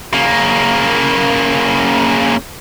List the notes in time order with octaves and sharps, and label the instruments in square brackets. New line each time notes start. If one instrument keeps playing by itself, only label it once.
[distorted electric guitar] C#3 A#3